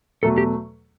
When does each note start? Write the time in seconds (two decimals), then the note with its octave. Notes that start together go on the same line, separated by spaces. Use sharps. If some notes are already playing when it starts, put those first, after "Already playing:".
0.23 E2 B2 F#3 A3 A4
0.38 G4